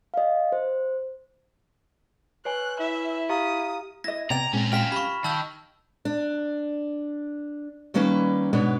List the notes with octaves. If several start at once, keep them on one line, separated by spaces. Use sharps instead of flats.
D#5 F5
C5
B4 C#5 G#5 F#6
E4 E5
G4 F5 A#5 D#6
E4 D#5 G#6 A#6
C3 B3 D5 G5 A#5 G#6 F7
A#2 G#3 C4 C#4 A#4
F4 G5 F6 B6 E7
G4 F5 B5 C#6
D#3 A5 E6 G6
D4
D#3 G3 A#3 C#4 B4
G#2 B2 B3 D4 B4 C#5